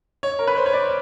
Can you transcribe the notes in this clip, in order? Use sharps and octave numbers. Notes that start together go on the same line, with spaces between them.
C#5
A#4
B4
C5
C#5
D5